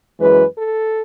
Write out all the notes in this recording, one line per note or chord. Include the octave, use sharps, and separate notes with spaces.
F#2 E3 G#3 B4
A4